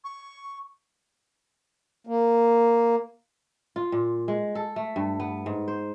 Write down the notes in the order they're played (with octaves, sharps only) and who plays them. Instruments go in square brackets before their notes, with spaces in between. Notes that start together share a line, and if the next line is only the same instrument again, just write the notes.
[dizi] C#6
[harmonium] A#3
[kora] F4
A#2
G#3
A4
A3
G2
B3
G#2
C5